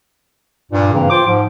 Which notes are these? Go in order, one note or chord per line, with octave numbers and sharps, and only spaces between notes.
G2 A#2
G2 C#3 E3 A#3 C4
F4 C5 G5 D6
G#2 F3